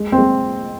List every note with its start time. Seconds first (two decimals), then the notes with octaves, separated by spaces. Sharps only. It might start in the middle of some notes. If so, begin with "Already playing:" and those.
Already playing: G#3
0.12 C4
0.18 G#3